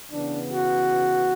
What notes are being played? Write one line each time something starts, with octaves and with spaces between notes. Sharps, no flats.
C#3 E3 B3 D4
F#4